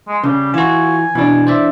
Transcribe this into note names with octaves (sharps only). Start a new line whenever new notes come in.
G#3
C#3 G3
E3 F4 F#4 G#5
B2 E3 D4
C5 D5 E5